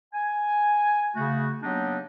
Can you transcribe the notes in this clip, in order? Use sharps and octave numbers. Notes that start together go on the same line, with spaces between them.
G#5
C#3 A3 F#4
F#3 A#3 B3 D4 D#4 G4